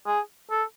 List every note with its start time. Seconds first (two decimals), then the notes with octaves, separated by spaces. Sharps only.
0.07 G#4
0.50 A4